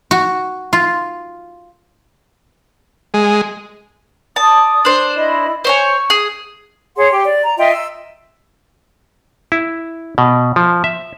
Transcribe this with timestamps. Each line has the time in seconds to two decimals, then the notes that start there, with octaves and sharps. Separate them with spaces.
0.11 F#4
0.73 F4
3.14 G#3
4.36 D5 A5 D#6
4.85 D4 C5
5.14 E4 D#5 B5
5.65 C5 C#5 G#5 C#6
6.10 G#4
6.97 G#4 C#5 F#5 C6
7.12 G4 G5
7.25 D5
7.44 A#5
7.58 F4 D#5 E5 G5
7.71 E6
9.52 E4
10.18 B2
10.56 F3
10.84 E5